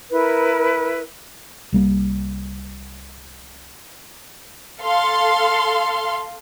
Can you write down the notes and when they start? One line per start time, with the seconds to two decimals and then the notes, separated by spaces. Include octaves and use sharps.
0.11 E4 A#4 B4
1.72 C2 G3 A#3
4.81 A4 F5 C6